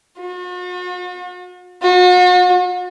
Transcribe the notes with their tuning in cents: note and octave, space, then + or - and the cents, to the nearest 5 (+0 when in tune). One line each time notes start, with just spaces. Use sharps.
F#4 -45
F#4 -40